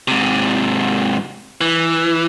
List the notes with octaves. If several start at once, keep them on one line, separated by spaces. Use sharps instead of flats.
G#2 C3
E3